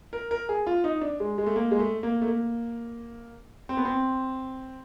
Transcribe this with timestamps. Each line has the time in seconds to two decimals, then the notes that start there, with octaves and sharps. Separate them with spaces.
0.13 A#4
0.31 A#4
0.49 G#4
0.67 F4
0.84 D#4
1.01 D4
1.20 G#3
1.38 G#3
1.46 A3
1.56 A#3
1.71 G#3
1.79 A3
2.03 A#3
2.21 A3
2.27 A#3
3.69 C4
3.77 B3
3.85 C4